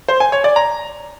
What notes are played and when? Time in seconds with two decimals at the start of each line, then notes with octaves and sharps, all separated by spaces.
0.08 C5
0.20 G#5
0.32 C#5
0.44 D5
0.56 A#5